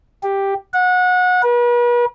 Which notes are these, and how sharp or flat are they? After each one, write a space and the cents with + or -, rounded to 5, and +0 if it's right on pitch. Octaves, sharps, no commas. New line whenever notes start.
G4 +5
F#5 -25
B4 -40